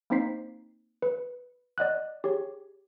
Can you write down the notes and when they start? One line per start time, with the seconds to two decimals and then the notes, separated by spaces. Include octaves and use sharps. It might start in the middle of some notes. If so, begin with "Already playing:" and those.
0.10 A#3 C4 D#4 C5 B6 C7
1.02 B4
1.78 D5 D#5 F#5 F#6
2.24 G4 G#4 C#5